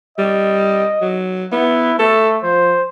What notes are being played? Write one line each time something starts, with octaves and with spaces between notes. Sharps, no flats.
G3 D#5
F#3
B3 E4
A3 A4
F3 C5